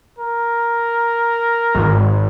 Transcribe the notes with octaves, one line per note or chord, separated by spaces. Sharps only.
A#4
G#1